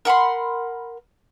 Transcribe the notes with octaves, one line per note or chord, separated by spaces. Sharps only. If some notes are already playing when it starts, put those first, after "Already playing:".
A#4 F#5 B5 C6